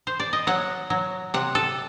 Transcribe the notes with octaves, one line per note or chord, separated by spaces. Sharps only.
C5
D5
D#5
F#3 F#5
F#3
C3 F#5
A4